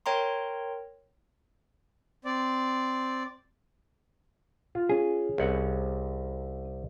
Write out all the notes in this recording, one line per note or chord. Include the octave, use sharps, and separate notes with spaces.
A#4 C#5 G5 A#5 C6
C4 D5
F4
C#4 G#4
C2 F#5